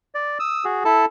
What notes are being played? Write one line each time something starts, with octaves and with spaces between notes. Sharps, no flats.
D5
D#6 E6
F#4 G#4
E4 A4 A5